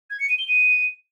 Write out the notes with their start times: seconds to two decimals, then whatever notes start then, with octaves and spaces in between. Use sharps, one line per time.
0.10 G#6
0.20 C#7
0.29 D#7
0.39 G7
0.48 D#7